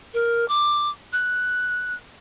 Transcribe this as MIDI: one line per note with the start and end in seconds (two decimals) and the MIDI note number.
0.13 0.47 70
0.48 0.89 86
1.12 1.93 90